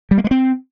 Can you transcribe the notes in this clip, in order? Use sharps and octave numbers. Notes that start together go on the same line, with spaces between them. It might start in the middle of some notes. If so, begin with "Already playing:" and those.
G3
A#3
G#3
C4